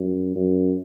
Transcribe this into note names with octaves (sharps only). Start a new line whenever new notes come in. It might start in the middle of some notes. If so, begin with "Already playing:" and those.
Already playing: F#2
F#2